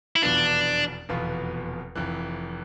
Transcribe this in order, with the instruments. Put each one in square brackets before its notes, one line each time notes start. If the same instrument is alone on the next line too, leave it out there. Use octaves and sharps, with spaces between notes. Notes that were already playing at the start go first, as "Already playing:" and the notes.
[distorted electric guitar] E4
[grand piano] F1 E2 B2 B3 F4 [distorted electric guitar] D4
[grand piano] F1 E2 B2 B3 F4
F1 F2 E3